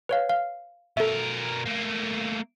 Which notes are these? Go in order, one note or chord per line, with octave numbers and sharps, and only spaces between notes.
B4 C#5 F5
F5
B2 A4 A#4 E5
A3 A#3